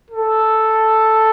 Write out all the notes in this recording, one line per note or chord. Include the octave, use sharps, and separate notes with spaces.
A4